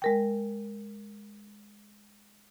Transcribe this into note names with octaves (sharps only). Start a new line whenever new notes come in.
G#3 A#4 G5